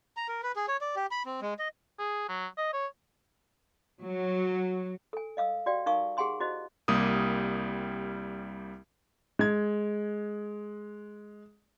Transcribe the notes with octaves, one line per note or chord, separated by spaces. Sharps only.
A#5
A#4
B4
G#4
C#5
D5
G4
B5
C4
G#3
D#5
G#4
F#3
D#5
C#5
F#3
A4 G#5
D#5 F5 D#6 E6
F#4 G4 D5 F5 G5
D#4 A#4 F5 G#5 C#6 D#6
G4 G#4 F#5 G#5 C6 D#6
E4 F#4 C5 D#5
C2 G3 A#3 G4 D#6
G#3 G#6